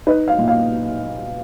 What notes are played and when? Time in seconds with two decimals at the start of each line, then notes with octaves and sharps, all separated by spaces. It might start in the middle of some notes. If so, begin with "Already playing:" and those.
0.07 D#4 B4
0.28 F5
0.38 A#2
0.48 F5